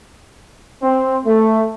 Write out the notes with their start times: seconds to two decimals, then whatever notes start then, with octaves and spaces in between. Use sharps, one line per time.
0.83 C4
1.26 A3